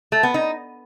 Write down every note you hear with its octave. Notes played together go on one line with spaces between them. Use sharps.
A3
B3
D#4